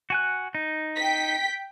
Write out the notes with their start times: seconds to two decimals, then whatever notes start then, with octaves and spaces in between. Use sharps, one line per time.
0.10 F#4 G#5 F#6
0.55 D#4
0.96 G5 B6